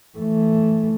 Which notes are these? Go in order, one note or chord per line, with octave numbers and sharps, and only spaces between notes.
E3 A3